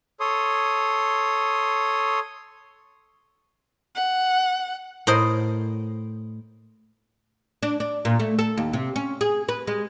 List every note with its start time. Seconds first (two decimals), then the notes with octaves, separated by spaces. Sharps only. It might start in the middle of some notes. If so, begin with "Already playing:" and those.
0.20 A4 C#5 C6 D#6
3.95 F#5
5.07 A2 A#4 C5 D#5
7.63 D4
7.80 D4
8.05 A#2
8.19 A3
8.39 A4
8.57 D#2
8.73 C3
8.96 C#4
9.21 G#4
9.49 B4
9.67 G#3